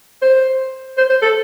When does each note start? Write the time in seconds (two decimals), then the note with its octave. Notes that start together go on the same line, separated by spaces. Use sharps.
0.22 C5
0.98 C5
1.09 C5
1.22 A4